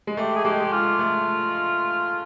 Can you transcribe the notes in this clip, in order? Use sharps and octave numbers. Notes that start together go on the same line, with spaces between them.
G#3
A3 G4
G#4
G#3 G4
F4
A3